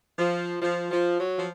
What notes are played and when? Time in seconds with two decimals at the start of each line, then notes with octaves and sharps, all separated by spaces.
0.19 F3
0.62 F3
0.91 F3
1.20 F#3
1.37 F3